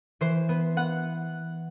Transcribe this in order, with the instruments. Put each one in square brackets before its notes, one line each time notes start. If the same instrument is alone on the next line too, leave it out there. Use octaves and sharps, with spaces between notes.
[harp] E3 C5
B3
B3 F#5